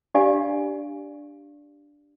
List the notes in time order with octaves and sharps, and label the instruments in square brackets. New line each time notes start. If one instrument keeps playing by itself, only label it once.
[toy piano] D4 G4 D5 F5 G#5